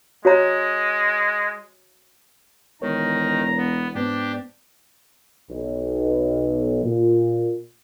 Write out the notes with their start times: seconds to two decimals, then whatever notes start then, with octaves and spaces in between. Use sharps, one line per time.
0.25 G#3 F#4 C#5 A#5
2.82 E1 D#3 A#4 C#5 A#5
3.57 B3
3.95 G#2 B3 C4 D4 G4
5.49 B1
6.84 A#2